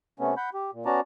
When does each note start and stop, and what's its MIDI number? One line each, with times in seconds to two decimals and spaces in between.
0.20 0.34 48
0.20 0.34 57
0.20 0.34 59
0.20 0.34 61
0.37 0.50 78
0.37 0.50 83
0.37 0.50 91
0.54 0.71 67
0.73 0.85 46
0.86 1.00 59
0.86 1.00 61
0.86 1.00 66
0.86 1.00 74
0.86 1.00 81
0.86 1.00 82